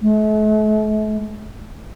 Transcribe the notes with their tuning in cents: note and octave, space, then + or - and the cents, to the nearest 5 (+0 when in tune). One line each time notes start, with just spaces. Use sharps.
A3 -45